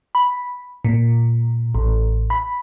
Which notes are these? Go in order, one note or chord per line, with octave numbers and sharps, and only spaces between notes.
B5
A#2
A1
B5